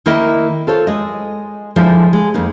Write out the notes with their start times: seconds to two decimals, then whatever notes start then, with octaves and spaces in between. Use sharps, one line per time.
0.06 D#3 A#3 E4 A#4 D#5 E5
0.67 F4 A4 C5 C#5
0.87 G#3 D#5
1.76 D3 F3 G#3 E4 F4 C5
2.13 G#3
2.34 F2 A#3 D#4